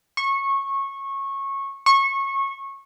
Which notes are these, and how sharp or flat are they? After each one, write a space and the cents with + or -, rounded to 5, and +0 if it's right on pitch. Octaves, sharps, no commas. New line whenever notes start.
C#6 -20
C#6 -25